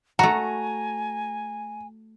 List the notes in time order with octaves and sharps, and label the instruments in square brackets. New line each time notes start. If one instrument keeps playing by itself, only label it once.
[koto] A3 F#4 [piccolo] G#5 [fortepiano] A#5